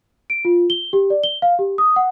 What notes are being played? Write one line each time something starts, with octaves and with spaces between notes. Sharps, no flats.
D7
F4
G7
G4
D5
G7
F5
G4
D#6
F#5